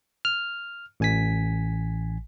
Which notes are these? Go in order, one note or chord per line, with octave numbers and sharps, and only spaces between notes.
F6
A1 G#5 B6